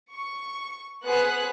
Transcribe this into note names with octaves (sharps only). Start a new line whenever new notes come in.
C#6
B3 G#4 B4 C5 F#5 F#6